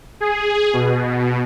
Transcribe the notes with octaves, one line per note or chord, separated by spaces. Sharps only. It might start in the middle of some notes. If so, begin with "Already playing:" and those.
G#4
B2